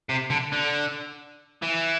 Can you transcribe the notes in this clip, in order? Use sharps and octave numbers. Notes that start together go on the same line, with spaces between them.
C3
D3
D3
E3